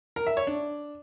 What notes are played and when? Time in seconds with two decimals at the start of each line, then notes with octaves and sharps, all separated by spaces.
0.16 A#4
0.27 E5
0.37 C#5
0.47 D4